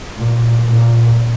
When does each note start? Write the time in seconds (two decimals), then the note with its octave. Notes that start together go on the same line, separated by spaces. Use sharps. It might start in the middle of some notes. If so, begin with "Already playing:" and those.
0.17 A#2
0.69 A#2